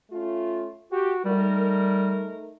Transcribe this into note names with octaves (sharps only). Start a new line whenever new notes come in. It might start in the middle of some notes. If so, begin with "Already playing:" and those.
A3 C#4 F4
F#4 G4
G3 A3 D#4 A#4